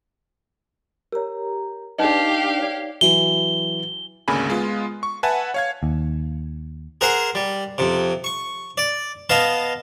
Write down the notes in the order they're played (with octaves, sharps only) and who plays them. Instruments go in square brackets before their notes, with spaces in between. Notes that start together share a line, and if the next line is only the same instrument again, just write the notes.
[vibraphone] G4 A#5 [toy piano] A#4 C#5
[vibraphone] D4 D5 [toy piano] D#4 B4 D#5 [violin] G4 F5
[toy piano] C#5 D5
[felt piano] E3 F#3 [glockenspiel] G7
[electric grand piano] G#1 D2 C#3 A#3 G#5 B5
G#3 B3 F4
C#6
B4 E5 F#5 G#5 A5
C#5 F5 G#6
[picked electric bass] D#2
[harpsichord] G#4 A#4 C5 F#5
G3
F2 C3
C#6
D5
B3 D#5 F5 A5